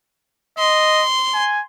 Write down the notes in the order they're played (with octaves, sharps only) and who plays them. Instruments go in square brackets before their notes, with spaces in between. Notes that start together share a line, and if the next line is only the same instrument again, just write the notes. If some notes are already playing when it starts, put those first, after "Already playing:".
[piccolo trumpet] D#5 [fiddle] C6
[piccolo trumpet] G#5